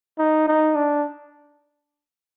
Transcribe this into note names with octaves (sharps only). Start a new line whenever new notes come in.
D#4
D#4
D4